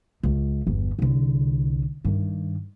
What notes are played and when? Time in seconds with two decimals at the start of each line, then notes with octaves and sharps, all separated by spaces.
0.23 C#2
0.67 G1 E2
0.99 C2 D3
2.05 G2 D#3